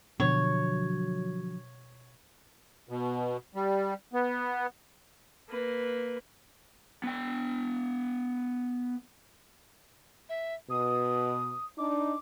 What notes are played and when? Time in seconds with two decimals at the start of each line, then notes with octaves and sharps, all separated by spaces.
0.20 B2 D3 F3 F#3 D4 C#5
2.89 B2
3.55 G3
4.13 B3
5.49 A#3 B4
7.04 B3 G5
10.29 E5
10.70 B2 D#6
11.78 D4 D#4 D6